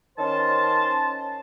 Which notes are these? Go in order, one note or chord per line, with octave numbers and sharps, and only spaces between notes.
D#3 C#4 C5 A5